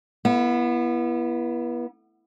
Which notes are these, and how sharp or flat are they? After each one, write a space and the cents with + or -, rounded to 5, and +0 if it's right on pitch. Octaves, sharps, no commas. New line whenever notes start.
B3 -30 E4 +20